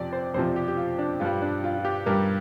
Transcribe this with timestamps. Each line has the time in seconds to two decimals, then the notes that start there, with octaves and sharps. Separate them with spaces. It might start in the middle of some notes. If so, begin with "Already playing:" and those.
Already playing: F2 C3 F3 D5
0.13 C5
0.34 F2 C3 F3 C5
0.56 G4
0.68 G4
0.77 F4
0.99 D4
1.20 G2 G3 F4
1.42 D4
1.64 F4
1.78 F4
1.85 G4
2.06 G2 G3 A#4